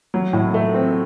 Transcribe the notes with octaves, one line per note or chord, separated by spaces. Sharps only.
F#3
A2
A3
C4